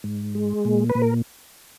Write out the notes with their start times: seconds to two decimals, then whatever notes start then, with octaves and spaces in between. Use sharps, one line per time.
0.04 G#2
0.35 G#3
0.65 A#2
0.90 B4
0.95 A#2
1.02 A#4